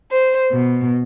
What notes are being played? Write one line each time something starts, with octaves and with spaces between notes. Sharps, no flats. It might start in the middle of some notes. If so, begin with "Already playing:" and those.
C5
B2